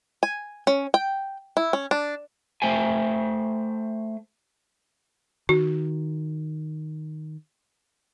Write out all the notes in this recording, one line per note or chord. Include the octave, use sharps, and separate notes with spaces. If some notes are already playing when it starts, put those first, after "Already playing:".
G#5
C#4
G5
E4
C#4
D4
A3 C5 G5 G#5
D#3 F#4